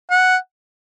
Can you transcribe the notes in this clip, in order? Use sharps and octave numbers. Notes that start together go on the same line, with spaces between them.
F#5